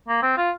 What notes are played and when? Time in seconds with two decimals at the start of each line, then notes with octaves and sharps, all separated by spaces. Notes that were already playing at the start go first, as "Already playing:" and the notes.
0.08 A#3
0.23 C4
0.37 F4